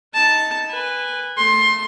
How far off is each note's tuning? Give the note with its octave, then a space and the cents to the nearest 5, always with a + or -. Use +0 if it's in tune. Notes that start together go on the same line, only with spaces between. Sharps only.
D#4 +20 A5 +0
B4 +0 G#5 -20
A3 +0 C6 +20